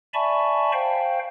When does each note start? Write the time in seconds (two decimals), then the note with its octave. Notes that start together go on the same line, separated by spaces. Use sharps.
0.14 D5 E5 G#5 A5 B5 C#6
0.73 C5 F5 G5